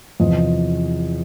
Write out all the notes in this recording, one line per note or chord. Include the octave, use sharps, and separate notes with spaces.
E2 C3 F3 D#5